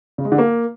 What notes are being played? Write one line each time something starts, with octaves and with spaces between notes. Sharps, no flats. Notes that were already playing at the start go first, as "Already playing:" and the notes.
C#3
G#3
D3
A#3